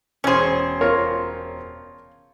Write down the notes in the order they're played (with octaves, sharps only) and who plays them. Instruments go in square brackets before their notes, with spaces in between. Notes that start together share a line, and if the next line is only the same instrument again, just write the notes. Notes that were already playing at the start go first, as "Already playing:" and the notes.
[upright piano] E1 C5 [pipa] C#4 G#4
[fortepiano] F4 A#4 C#5